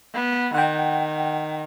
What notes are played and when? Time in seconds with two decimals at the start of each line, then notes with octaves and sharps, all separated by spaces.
0.14 B3
0.54 D#3 F#5 G5